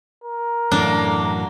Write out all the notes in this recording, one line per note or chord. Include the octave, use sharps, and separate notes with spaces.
A#4
F#2 A2 E3 F#3 A3 A#3 D4